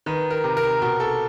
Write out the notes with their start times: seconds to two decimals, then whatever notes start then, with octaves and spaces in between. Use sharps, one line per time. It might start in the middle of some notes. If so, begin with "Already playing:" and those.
0.06 D#3 B4
0.31 A#4
0.44 C3
0.57 A#4
0.82 B2 A#4
1.00 A4